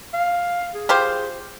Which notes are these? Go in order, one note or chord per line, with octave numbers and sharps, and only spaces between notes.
F5
G#4
F4 G4 C5